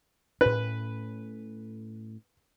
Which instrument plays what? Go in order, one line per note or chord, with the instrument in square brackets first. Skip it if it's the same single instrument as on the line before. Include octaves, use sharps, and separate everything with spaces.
[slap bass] A2 C#4 [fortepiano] B4